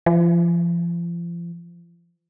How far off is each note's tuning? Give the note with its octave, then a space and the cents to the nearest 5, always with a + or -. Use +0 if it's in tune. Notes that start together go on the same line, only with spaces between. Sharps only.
F3 -35